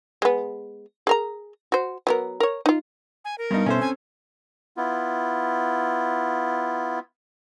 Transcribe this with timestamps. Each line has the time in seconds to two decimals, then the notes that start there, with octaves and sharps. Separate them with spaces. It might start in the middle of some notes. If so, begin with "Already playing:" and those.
0.22 G#3 B3
1.07 G#4 A#4 A#5
1.72 F#4 C5
2.07 F#3 B3 A#4
2.40 A#4 C#5
2.66 D#4 F4
3.25 G#5
3.38 A#4
3.51 G2 G3 B3 D#4
3.66 B2 B3 C#4 A4 C5 E5
3.81 C4 G#5
4.77 B3 E4 F4